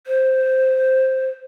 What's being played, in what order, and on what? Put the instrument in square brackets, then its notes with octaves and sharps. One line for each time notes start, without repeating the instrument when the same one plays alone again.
[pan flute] C5